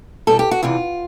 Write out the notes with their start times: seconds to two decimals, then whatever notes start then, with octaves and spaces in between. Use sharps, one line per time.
0.27 E2 B2 G3 A4
0.39 G4
0.51 F#4
0.63 E2 C3 E3 F4